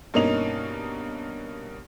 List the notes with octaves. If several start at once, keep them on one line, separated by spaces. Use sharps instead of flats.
G2 B2 A#3 C#4 D#4 F7